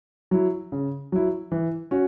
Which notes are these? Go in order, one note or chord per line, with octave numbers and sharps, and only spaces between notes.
F#3 E4
C#3
F#3 E4
E3
C#4 F#4